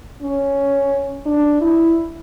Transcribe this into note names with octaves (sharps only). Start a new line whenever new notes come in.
C#4
D4
E4